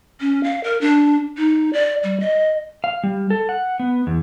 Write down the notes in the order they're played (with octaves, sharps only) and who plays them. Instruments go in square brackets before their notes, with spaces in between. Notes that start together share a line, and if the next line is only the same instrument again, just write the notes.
[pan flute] C#4
F5
A#4
D4
D#4
D5
G3
D#5
[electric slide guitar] F5
G3
A4
F#5
B3
E2